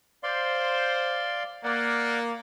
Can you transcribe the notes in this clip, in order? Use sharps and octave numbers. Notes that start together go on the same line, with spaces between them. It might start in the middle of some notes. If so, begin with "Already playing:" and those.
C5 D5 F5 C6
A#3 D5 F#5